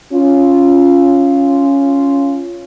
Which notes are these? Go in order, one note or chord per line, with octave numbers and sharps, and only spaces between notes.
C#4 F4